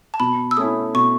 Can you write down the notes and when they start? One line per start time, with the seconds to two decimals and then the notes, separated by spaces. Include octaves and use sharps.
0.14 A5
0.20 B2 B5
0.51 E6
0.57 A3 C#4 E4 D#6
0.94 B2 C#6